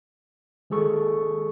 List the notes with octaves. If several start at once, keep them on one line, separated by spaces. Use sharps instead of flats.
D#3 G#3 G#4 A4 C#6